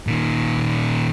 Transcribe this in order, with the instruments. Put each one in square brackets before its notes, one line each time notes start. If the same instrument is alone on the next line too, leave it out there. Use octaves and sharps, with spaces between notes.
[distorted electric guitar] A#2 D#3